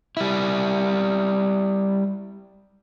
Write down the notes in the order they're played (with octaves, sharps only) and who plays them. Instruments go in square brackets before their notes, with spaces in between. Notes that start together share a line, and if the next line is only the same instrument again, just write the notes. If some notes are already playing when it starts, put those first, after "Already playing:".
[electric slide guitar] G3 E4